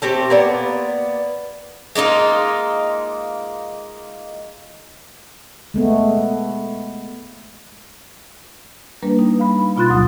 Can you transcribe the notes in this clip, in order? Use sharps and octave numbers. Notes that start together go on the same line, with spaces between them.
A3 C4 G4
A#3 B3 D5
G#3 A#3 D#4 F4
G#3 A3 B3
G3 A#3 D4 B4
D#4
F5 B5
B2 F4 C6 F#6 A6
D2 G2 F#3 D#6